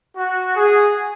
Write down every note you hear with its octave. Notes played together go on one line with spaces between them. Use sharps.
F#4
G#4